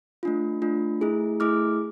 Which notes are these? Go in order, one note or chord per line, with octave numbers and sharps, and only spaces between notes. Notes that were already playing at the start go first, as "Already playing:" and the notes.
A3 D4 F4
A3 D4 F4
A3 E4 G#4
A3 E4 G#4 D6 F6